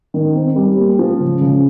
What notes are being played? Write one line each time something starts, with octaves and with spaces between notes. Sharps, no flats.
D#3
C4
G3
A#3
F3
C#3
C#3